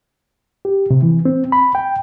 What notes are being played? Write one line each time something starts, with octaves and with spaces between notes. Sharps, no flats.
G4
C3
E3
C4
B5
G5